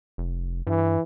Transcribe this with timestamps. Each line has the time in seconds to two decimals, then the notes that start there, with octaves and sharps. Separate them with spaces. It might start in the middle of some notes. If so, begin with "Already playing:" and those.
0.18 F1
0.67 G2 E3